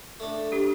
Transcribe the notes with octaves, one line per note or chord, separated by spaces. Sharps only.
A3 D4
D4 G4